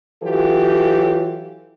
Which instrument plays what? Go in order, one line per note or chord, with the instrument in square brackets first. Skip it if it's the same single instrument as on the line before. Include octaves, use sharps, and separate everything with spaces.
[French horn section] E3 F#3 F4 G4 A4